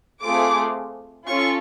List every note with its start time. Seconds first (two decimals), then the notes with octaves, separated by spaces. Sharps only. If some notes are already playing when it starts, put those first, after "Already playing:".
0.22 A3 C4 F4 G#4 D6
1.27 C#4 F4 A4 C#6